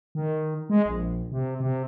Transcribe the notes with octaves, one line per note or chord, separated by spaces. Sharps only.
D#3
G#3
A#1
C3
C3